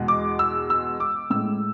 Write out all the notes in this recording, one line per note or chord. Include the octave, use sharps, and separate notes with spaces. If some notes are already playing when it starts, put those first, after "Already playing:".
Already playing: E2 B2 G#3
D6
E6
E6
D6
A2 G#3 E6